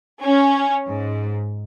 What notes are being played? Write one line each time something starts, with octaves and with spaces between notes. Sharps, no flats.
C#4
G#2